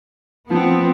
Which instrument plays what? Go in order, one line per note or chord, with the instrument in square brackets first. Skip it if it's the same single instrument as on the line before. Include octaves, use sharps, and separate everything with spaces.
[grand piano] F3 [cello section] B3 C4